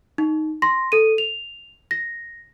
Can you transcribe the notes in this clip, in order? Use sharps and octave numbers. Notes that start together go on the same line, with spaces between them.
D#4
C6 A#6
A4 D#7
F7
A#6